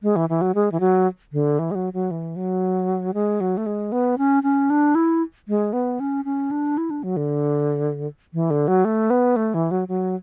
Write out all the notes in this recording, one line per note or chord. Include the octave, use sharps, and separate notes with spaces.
G#3
E3
E3
F#3
G#3
E3
F#3
D3
E3
G#3
F#3
F#3
E3
F#3
G#3
F#3
A3
G#3
B3
C#4
C#4
D4
E4
G#3
B3
C#4
C#4
D4
E4
D4
F#3
D3
E3
D3
F#3
A3
B3
A3
E3
F#3
F#3